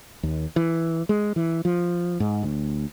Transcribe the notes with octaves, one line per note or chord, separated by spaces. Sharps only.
D#2
E3
G#3
E3
F3
G#2
D2